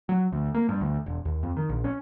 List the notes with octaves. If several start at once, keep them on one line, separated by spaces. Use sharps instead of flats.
F#3
D2
A#3
G2
D2
E1
D#2
F2
D#3
A#1
C#4